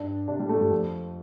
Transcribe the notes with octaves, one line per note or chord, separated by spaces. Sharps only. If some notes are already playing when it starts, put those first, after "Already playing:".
Already playing: G2 D4
C3 D4
G3
A2
A3
G2 G3
F2 F3